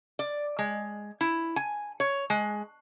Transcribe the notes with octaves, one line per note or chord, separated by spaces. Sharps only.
D5
G#3
E4
G#5
C#5
G#3